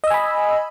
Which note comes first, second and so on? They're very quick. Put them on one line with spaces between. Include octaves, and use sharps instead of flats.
D#5 E6 G#5 B5